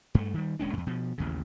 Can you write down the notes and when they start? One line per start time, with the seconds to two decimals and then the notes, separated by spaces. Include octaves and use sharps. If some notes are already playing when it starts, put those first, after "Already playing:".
0.15 G2 A3
0.34 D#3 G3
0.59 D#1 G#3 C#4 D4
0.73 E2 G#2
0.87 B2 F3
1.18 A1 D#2 C#3